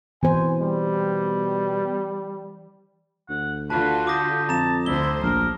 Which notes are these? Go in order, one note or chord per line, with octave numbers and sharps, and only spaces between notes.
B2 E3 C5 G#5
G3
D2 F#5
D3 F4 F#4 B4 A5
G4 D6 D#6 A#6
F2 A5 A#5 E7
D2 D3 E4 C5 G7
A#1 F#3 A#4